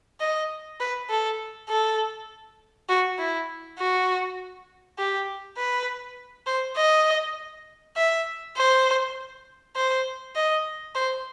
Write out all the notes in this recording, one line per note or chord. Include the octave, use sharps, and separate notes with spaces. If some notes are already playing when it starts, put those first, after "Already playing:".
D#5
B4
A4
A4
F#4
E4
F#4
G4
B4
C5
D#5
E5
C5
C5
D#5
C5